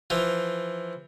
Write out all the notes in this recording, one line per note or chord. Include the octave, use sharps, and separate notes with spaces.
E3 F3